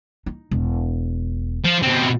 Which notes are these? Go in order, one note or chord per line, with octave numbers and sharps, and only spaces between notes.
D#4
E1
F3
B2 C4